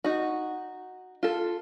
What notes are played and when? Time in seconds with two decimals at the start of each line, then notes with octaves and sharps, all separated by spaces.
0.04 D#4 F#4
1.23 F4 A4